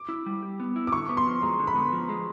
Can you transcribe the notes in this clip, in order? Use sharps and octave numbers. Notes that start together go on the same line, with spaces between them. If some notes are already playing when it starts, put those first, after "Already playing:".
Already playing: D6
E4
G3
G4
B3
E4
D6
D3 C#6
B3
C6
F3
G#3 A#5
D3
B5
B3
F3
G#3